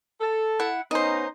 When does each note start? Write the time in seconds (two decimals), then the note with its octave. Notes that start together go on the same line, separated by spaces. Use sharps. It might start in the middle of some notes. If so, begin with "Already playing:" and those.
0.21 A4
0.59 E4 F#5
0.91 B3 C#4 D#4 C5 D#5